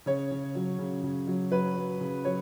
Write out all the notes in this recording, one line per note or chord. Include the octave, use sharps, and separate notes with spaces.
C#3 C#5
C#3
F#3
C#3
C#3
F#3
F#3 B4
F#3
C#3
F#3 C#5